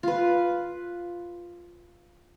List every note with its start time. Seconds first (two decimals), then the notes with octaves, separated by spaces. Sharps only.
0.03 F4 B4